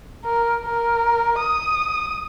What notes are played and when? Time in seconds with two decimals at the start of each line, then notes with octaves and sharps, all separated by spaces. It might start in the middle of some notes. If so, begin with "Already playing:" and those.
0.25 A#4
0.65 A#4
1.39 D#6